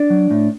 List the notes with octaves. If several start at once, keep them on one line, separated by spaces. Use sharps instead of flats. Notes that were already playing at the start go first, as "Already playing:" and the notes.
Already playing: D4 D5
F#3
A2